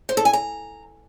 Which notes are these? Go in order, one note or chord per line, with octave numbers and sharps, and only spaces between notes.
C5
A4
G#5
A#5